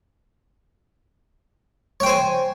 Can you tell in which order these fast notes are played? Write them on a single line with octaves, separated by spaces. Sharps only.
C#5 G5 C5 G#5